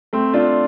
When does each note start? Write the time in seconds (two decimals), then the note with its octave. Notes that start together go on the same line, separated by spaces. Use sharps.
0.13 A3 C4
0.34 D4 F4